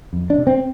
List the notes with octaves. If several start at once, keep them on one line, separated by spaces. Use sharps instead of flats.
F2
D4
C3
C4